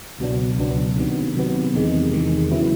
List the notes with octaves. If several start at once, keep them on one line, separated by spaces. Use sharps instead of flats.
C#2 B2 F#3 B3 D4
C#2 B2 F#3 B3 D4
C3 D#3 F#3 B3
C3 D#3 F#3 B3
E2 C3 D#3 G#3
E2 C3 D#3 G#3
C#3 F#3 B3 E4